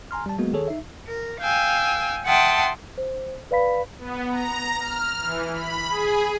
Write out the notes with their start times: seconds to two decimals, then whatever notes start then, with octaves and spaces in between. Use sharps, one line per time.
0.11 G#5 A#5 C6 F6
0.26 G3 A5
0.38 F#3 G#3 A#3 B3 F#4
0.53 D#3 G#4 A4 C#5
0.68 D#4 E5
1.07 A#4
1.40 F5 G5 G#5 E6
2.26 E5 F#5 G5 A5 C6 D#6
2.98 C5
3.51 B4 D5 F5 B5 B6
3.99 B3
4.31 A#5
4.79 F6
5.20 E3
5.53 B5
5.88 G#4